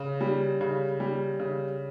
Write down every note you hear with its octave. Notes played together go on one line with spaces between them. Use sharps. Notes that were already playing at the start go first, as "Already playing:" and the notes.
Already playing: C#3
G3
C#3
G3
C#3